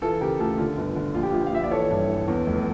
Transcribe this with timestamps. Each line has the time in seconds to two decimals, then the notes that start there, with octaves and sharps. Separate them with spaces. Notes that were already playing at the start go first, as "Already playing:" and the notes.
0.02 E3 F4 A4
0.21 C#3 G4 A#4
0.39 D2 F4 A4
0.58 D3 F4
0.77 G1
0.96 D3
1.15 A#1 F4
1.23 G4
1.32 A#1 F4
1.46 F5
1.52 A#1 E5
1.63 D5
1.71 E3 A4 C#5
1.90 G2
2.09 E3
2.28 E2
2.46 F1